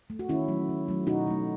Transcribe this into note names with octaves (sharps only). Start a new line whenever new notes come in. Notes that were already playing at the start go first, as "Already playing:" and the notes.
A3
F#4
D#3 C#4 E4
F#3 A3
D#3
F#3 A3
B2 D#4 F#4
F#3 A3